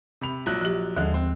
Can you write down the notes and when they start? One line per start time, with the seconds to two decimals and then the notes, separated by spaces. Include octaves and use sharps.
0.21 C3 B5 F7
0.46 A#1 F#3 F#6
0.61 F3 G4
0.97 D#2 D3 F3 G#3
1.14 C4